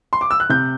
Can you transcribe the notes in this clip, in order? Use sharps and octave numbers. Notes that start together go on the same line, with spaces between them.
C6
D6
E6
F#6
C3 G6